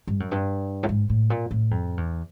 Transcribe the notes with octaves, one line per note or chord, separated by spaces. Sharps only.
G2
F#2
G2
A2
G#2
A2
A#2
A2
F2
E2